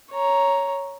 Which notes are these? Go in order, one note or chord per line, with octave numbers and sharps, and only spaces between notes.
C#5 A#5